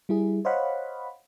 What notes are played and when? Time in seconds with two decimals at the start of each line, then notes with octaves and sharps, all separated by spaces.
0.09 G3 E4 G#4
0.45 C5 C#5 D#5 F5 F#5 B5